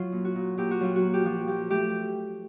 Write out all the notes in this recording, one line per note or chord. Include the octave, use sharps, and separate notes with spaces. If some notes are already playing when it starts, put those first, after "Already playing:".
Already playing: F#3 F4
A#2
F#4
A#2
A#2 G4
F#4
F#3 F4
F#4
A#3
G4
F3 F#4
F3 G4
A3 G4